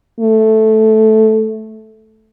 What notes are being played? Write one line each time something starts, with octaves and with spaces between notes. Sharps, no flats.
A3